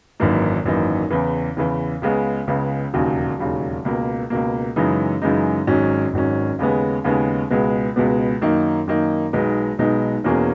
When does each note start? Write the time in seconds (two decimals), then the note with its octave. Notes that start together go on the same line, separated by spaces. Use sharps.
0.20 G#1 F#2 E3 A#3 D#4
0.65 G#1 F#2 E3 A#3 D#4
1.11 E2 C#3 E3
1.57 E2 C#3 E3
2.02 C#2 C#3 G#3 B3
2.47 C#2 C#3 G#3 B3
2.93 E1 D#2 C#3 F#3
3.39 E1 D#2 C#3 F#3
3.85 C#2 B2 A#3
4.30 C#2 B2 A#3
4.76 F#2 C#3 E3 G#3 D#4
5.22 F#2 C#3 E3 G#3 D#4
5.67 G#1 G#2 F#3 C#4
6.13 G#1 G#2 F#3 C#4
6.59 D#2 C#3 G#3 B3
7.04 D#2 C#3 G#3 B3
7.50 C#2 B2 G#3 B3
7.96 C#2 B2 G#3 B3
8.42 F#2 D#3 A#3 D#4
8.87 F#2 D#3 A#3 D#4
9.33 B1 B2 G#3 B3 D#4
9.78 B1 B2 G#3 B3 D#4
10.24 E2 B2 A#3 C#4 G#4